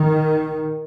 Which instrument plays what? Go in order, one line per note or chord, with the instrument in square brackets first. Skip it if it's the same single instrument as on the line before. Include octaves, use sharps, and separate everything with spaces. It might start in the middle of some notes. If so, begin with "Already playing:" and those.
Already playing: [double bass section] D#3